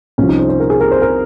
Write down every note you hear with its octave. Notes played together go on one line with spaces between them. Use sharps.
C2 C3 F3 C#4
D#4
C5
C5
A#4
G#4
A#4
C5
A#4